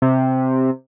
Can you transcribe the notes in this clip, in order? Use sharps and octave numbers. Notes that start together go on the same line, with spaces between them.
C3